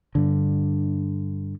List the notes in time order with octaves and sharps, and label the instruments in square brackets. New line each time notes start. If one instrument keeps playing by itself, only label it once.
[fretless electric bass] G2 D3